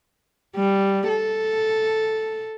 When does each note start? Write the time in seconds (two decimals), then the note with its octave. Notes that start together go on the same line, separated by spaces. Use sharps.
0.56 G3
1.08 A4